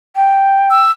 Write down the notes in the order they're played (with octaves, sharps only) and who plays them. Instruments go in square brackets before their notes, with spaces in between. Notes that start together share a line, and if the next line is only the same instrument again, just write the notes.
[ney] G5
[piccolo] E6